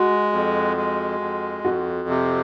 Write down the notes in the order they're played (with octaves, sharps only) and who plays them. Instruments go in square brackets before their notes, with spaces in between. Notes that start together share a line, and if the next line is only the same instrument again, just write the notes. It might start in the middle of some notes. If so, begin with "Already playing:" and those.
Already playing: [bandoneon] G#3 [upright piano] F#4
[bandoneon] F2
G#3
F2
[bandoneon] F2 [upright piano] F#4
[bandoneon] C3